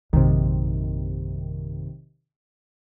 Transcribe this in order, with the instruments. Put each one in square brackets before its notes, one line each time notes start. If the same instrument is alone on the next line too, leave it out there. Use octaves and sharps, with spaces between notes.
[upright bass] A#1 F#2 [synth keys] C3 D#3